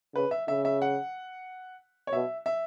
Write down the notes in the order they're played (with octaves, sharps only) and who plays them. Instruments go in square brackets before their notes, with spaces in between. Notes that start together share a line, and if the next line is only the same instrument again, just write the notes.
[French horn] C#3 [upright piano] B4
[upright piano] E5
[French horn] C#3 [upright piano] E5
[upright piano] E5
F#5
C#5
[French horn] B2 [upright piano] E5
[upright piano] E5